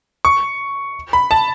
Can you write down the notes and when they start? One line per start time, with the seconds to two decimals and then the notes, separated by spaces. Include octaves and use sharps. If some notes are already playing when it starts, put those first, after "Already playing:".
0.25 C#6
1.13 B5
1.31 A5